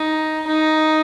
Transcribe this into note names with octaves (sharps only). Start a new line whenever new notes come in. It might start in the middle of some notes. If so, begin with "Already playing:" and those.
Already playing: D#4
D#4